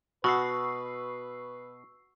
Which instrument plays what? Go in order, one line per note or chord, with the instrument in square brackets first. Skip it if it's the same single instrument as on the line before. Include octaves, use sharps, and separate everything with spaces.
[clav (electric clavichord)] B2 [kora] F#4 [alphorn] B4 [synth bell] C#6 E6 C7